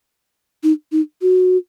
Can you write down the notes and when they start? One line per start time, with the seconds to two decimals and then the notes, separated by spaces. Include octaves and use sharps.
0.63 D#4
0.92 D#4
1.22 F#4